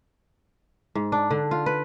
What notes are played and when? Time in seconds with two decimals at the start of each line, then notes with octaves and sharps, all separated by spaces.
0.95 G#2
1.12 D4
1.30 D3
1.51 F4
1.66 B4